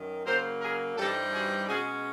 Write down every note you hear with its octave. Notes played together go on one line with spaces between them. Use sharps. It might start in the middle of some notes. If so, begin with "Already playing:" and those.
Already playing: F#2 D#3
C#3 F#3 A#3 A#4 C5
G#4 A#4
G2 E3 G3 C4 D#4 G4 A4
F#4 G#4
B2 G#3 C#4 F#4 G#4